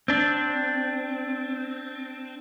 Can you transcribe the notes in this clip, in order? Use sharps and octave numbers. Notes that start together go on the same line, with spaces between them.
C4 D4